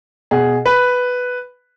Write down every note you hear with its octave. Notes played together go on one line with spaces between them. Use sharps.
B2 G#4
B4